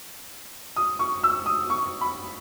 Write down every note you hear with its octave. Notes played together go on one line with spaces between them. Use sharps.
D#6
C#6
E6
D#6
C#6
B5